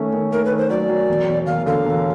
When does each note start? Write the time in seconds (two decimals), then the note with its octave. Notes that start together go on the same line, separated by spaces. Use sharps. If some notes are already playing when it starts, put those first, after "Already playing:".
Already playing: D#3 A3 C#4
0.13 D#3
0.32 A3 A#4
0.45 B4
0.51 D#3
0.58 C5
0.70 F#3 D5
0.89 F#3
1.09 E1
1.28 E1
1.46 E1 F5
1.66 D3 F5
1.85 E1